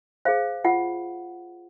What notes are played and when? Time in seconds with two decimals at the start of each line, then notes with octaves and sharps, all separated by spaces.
0.25 G#4 C5 F5
0.65 F4 F#5